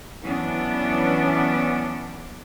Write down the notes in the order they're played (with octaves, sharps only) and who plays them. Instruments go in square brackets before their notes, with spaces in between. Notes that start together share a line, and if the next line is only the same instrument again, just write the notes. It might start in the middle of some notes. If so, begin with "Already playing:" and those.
[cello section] E3 F#3 B3 C#4 D4